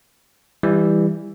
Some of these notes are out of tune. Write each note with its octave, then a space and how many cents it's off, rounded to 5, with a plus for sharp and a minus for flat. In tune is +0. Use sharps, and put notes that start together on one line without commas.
E3 +0 G3 +20